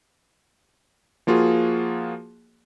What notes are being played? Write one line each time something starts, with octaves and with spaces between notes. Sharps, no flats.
F3 A#3 F4 F#4 G#4